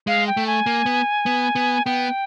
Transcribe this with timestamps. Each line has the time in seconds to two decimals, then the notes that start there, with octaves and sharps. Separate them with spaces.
0.07 G#3 F5
0.27 G5
0.37 A3
0.47 G#5
0.66 A#3
0.86 B3
1.26 B3
1.55 B3
1.85 B3 G5